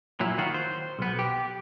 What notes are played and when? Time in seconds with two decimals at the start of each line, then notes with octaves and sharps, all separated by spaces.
0.20 A#2 F#3 E4
0.38 D#3 F4 F#4
0.54 C5
0.99 B1 B3
1.19 G4